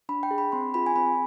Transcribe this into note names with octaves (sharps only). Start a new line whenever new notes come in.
D4 B5
G5
G#4
B5
C4 C6
F4 G#4 B5
G#5
C4 B5